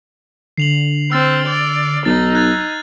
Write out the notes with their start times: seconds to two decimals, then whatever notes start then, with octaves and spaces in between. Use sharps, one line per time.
0.57 D3 C7 F7 F#7
1.12 C4 E6 F6 A6
1.47 D5
2.05 B1 D#4 A6
2.35 F#6 G#6 A6